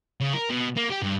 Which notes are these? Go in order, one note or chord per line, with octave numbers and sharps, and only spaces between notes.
C#3
A#4
B2
A#3
G4
G2